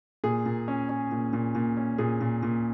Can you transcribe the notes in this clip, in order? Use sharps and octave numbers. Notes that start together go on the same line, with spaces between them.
A#2 G#4
A#2
C#4
C#4
A#2
A#2
A#2
C#4
A#2 G#4
A#2
A#2